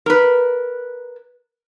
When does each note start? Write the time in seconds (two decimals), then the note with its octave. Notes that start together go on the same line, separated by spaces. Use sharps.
0.06 A#4 B4